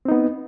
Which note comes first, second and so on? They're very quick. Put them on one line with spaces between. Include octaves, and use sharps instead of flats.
C4 D#4 B3